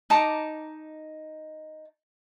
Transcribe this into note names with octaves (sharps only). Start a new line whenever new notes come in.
D#4 A5 A#5 D6